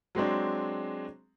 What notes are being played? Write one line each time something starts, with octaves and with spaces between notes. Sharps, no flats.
F#3 G#3 C4 D4